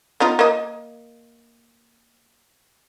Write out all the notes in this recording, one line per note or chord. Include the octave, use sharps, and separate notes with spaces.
B3 D#4 F4
A#3 D#5